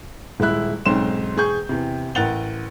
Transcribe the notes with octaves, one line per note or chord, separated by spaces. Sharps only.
D#1 G#3 E4 F#6
B1 G#2 C4 C#4 C6 E7
E1 G#4 C#6 G6
E2 C3
A1 A#4 F#5 A6 F7 G7